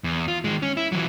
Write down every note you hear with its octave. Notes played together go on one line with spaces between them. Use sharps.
E2
F4
D#3 G#3
C#4
E4
E3 F#3